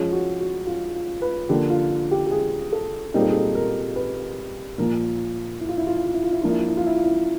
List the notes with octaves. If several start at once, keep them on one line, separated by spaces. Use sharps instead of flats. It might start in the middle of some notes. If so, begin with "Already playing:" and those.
Already playing: F3 G#3 C#4
F#4
F#4
F4
F4
B4
D3 F3 A#3 G4
F4
F4
G4
G4
G#4
A4
A#2 G3 C4 D#4 A#4
A4
G#4
A4
A#4
B4
A#2 F3 A#3 A#4
E4
F4
E4
F4
E4
F4
E4
F4
E4
F3 A#3 D4 F4
E4
F4
E4
F4
E4
F4
E4